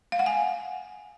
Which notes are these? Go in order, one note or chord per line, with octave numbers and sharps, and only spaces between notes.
F5
F#5
G#5